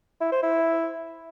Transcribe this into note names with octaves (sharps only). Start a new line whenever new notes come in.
E4
C5
E4